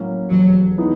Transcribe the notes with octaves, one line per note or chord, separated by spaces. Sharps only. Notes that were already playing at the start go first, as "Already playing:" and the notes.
Already playing: A2 F#3 A#3 C#4
F1 E2 B2 F#3
E3 G#3 B3 D#4